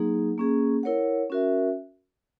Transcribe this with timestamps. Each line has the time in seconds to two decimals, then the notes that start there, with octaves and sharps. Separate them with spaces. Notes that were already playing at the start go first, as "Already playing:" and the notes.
Already playing: F#3 A#3 D#4 G#4
0.38 A#3 C#4 G#4
0.83 E4 A#4 C#5 F#5
1.30 C#4 F#4 A#4 E5